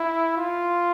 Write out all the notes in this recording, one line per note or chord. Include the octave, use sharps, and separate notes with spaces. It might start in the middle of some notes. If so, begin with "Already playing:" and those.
Already playing: E4
F4